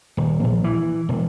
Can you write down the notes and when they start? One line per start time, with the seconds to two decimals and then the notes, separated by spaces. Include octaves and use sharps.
0.17 D#1
0.44 A#1
0.64 E3
1.09 E1